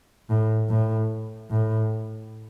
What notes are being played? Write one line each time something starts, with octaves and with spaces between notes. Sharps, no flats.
A2
A2
A2